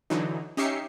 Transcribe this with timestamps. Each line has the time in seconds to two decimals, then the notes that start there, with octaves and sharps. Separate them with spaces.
0.10 D3 E3 F#3 D#4
0.57 C#4 D#4 G4 E5 C7 C#7